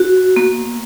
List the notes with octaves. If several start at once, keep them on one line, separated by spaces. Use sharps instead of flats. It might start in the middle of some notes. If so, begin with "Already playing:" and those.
Already playing: F#4
A#3